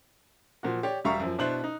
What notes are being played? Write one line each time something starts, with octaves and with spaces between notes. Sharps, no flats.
A#2 F3 F#4
G4 C#5 D5
E1 G3 E5 F5 A#5 C#6
F#2 F3
B2 D4 E4 C5 F#6 F#7
D#4